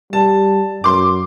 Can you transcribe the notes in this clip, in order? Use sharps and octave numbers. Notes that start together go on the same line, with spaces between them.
G3 A5
F#2 C6 D6